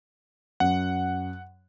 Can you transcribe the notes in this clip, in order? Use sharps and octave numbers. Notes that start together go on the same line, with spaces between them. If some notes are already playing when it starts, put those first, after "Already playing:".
F#2 F#5